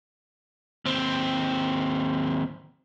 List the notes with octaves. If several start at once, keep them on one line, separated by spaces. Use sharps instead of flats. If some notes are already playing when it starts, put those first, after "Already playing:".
D#2 C4